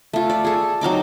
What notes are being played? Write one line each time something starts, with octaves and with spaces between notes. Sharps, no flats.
A3 F4
D5
G#4 A4
F#3 C4 D#4 D6